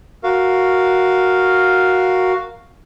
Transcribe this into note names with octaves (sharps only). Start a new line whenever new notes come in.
F#4 A#4 F5